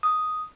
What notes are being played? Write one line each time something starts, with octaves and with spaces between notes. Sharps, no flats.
D#6